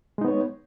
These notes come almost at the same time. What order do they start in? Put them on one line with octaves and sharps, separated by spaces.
G#3 D#4 B3 C#5